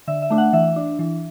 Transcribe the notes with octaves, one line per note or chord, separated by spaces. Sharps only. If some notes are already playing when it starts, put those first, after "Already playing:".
D3 E5
E5
A3 D4
F#5
E3 E5
D4
E3